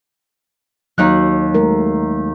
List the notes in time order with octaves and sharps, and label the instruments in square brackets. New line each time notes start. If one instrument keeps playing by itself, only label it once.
[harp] D#2 D#4 F#6 [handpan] F#3
[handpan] G#3 A3 A#4